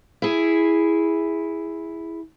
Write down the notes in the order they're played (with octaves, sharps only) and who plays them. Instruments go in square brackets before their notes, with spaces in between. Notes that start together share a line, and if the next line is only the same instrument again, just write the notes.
[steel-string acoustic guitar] E4 G#4